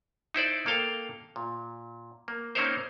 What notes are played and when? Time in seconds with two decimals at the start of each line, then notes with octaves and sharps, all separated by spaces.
0.34 D#4 E4 C5 D5
0.66 A#3 A4 F5 G5
1.36 A#2
2.28 A#3
2.55 A#3 C4 C#4 D#4 A#4 C5